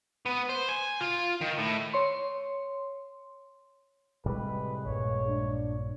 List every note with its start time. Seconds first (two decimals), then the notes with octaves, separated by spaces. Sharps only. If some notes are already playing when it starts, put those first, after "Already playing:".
0.26 B3
0.49 C5
0.69 G#5
1.01 F4
1.41 D#3
1.58 A2
1.93 C#5 C6
4.26 A2 C3 G3 G#3 B4
4.85 A#1 G2 A#2 C#5
5.28 D4